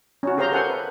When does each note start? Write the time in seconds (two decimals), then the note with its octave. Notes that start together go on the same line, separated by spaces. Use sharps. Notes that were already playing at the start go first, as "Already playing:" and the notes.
0.23 C#4 F#4
0.38 G4 G#4 C5 F5 A#5 C6
0.52 A4 A#4 C5 F#5 G#5 C6
0.70 B4